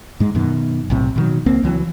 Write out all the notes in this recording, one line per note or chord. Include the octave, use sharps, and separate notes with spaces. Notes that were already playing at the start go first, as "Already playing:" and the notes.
G#2 G#3
F#2 B2 D#3
B1 A2 C3
B2 D#3 F#3
C#2 A#3 C4
C#2 E3 F#3